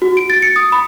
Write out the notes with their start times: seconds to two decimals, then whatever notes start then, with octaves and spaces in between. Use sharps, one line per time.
0.02 F#4
0.17 D7
0.30 A6
0.42 C#7
0.56 D#6
0.72 B5